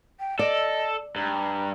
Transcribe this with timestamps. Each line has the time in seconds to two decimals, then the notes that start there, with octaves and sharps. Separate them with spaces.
0.20 G5
0.39 A4 D5 D#5
1.16 G2 A#5